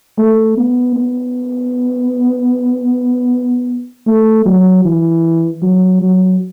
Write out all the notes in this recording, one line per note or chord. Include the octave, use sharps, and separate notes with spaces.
A3
B3
B3
A3
F#3
E3
F#3
F#3